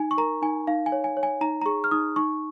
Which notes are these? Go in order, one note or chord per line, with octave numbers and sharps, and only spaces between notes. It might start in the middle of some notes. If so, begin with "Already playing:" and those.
Already playing: D#4 G#5
C#6
A#4 A#5
D#4 G#5
D#4 F5
G#5
C#5
G#5
C#5
G#5
D#4 A#5
A#5
G#4 C#6
F6
D#4 D#6
D#4 C#6